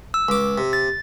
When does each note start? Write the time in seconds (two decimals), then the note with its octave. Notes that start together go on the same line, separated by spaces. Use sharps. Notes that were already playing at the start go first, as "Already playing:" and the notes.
0.14 E6
0.29 C#2 D6
0.58 C3
0.73 A6